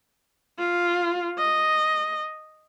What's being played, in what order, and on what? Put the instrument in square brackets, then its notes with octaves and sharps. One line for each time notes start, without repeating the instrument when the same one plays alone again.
[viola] F4
D#5